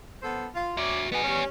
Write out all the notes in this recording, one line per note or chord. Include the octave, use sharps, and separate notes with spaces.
B3 A4 C5
F4
F#4 C#5 D5 E5
G#2 B2 B3 G#5
G3 C#4